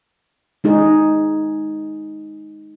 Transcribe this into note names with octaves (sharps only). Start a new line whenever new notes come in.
G#3 D#4 G#4